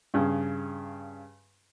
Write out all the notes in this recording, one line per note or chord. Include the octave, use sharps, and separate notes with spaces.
G2 C#3